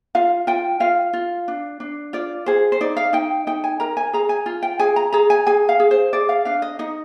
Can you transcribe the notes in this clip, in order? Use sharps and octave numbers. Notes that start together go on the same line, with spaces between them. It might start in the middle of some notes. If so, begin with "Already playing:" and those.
F4 F5
F4 G5
F4 F5
F4
D4
D4
F4 D5
G#4 C5
C5
D#4 D5
F5
D#4 G5
D#4 G5
G#5
A#4 A#5
G#5
G#4 A#5
G#5
F4
G5
G#4 G#5
A#5
G#4 A#5
G#5
G#4 G#5
F5
G#4
C5
G#4 D5
F5
D4 F5
D#5
D#4 D#5